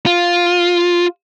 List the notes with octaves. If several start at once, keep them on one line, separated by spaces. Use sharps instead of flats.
F4